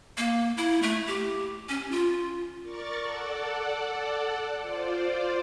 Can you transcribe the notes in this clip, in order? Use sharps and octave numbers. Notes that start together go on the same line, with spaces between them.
A#3
E4
A3
G4
C#4
F4
A#4 D5 C#6 A6
A4 D5 F#5
F4 C5 D5